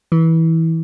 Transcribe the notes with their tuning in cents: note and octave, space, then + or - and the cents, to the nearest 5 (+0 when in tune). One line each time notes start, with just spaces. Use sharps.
E3 -20